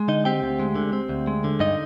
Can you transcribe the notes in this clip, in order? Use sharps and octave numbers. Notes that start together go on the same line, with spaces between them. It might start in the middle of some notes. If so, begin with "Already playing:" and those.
Already playing: G#3
D3 D#4 D#5
C4 G4 G5
D2
G#3
D3
C4
D2
G#3
D3
G2 D#4 D#5